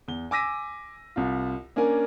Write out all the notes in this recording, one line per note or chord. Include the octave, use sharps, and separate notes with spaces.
E2 G7
G#5 D6 E6 A#6 B6 D#7
C2 F4
A#3 C#4 D4 A#4 G#5